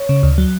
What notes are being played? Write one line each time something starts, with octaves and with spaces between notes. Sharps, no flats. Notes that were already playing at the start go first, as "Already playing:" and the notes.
Already playing: C#5
C#3
D2
F#3